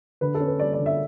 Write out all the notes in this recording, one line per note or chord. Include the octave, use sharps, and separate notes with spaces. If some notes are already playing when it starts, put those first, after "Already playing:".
D3 B4
A4
C#4
B4
G3 D5
D5
D3
E5